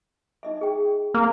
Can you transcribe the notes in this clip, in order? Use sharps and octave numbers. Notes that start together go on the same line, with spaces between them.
D#4 D#5 E5
G#4 G5
A#3